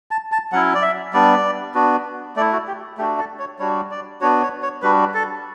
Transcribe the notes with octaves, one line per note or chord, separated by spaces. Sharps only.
A5
A5
F#3 C#4 E4 F#5
D5
E5
G3 B3 D4 D5
B3 D4 F#4
A3 E4 D5
F#4
G4
A3 D4 F#4 G4
A4
C#5
G3 D4 F#4 C#5
D5
B3 D4 F#4 C#5
C#5
C#5
G3 D4 F#4 B4
A4